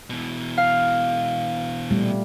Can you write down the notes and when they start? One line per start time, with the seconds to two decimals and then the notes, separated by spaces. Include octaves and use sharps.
0.10 B2 E3
0.57 F5
1.90 A#2 G3 A3